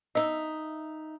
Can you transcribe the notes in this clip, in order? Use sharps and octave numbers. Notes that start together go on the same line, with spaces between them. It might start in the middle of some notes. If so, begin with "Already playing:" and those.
D#4 D#5 E5